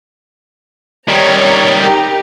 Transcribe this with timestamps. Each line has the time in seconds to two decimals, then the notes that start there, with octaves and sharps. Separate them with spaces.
1.08 D#3 G3 C#5 A#5
1.78 D#4 G4 A#4